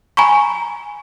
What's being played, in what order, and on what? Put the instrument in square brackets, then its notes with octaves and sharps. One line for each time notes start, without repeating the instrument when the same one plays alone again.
[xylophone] G#5 A#5 B5 C#6